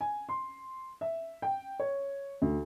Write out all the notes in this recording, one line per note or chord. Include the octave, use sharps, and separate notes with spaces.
G#5
C6
E5
G5
C#5
D2